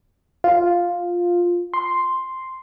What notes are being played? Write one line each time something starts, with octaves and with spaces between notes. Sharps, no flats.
F4
C6